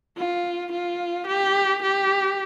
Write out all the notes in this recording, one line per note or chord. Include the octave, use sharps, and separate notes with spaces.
F4
F4
G4
G4